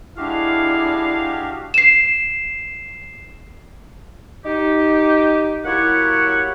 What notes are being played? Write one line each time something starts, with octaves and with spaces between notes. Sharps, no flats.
G#3 D4 E4 F#4 G4 F5
C7 E7
D#4 G4
F#3 A#3 E4 G4 C#5 F#5